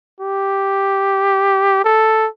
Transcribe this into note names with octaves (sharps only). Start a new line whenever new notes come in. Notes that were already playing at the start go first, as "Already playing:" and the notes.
G4
A4